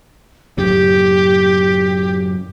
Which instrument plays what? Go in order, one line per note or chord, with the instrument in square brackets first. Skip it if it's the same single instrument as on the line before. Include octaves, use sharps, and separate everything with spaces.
[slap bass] F#2 A2 C#3 [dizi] G4